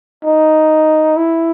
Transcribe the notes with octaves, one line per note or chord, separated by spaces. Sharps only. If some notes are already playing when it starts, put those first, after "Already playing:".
D#4
E4